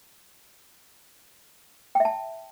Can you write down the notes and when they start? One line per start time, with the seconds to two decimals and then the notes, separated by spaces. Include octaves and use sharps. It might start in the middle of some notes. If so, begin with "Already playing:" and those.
1.95 G5
2.00 E5
2.05 A5